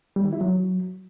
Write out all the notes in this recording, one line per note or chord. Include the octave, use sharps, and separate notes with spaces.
G3
D#3
E4
F#3